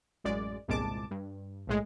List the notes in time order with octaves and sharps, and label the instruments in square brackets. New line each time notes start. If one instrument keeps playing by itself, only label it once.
[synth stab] A1 F#2 G#3 D5
G1 C2 A#2 G#3 A5 D6
G2
B1 A2 G#3